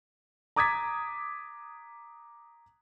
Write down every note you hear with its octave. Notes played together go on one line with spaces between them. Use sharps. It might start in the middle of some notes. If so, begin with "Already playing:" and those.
A#5 D6 D#6 G#6 A6 B6